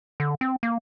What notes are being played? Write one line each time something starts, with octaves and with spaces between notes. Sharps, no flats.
D3
C4
A#3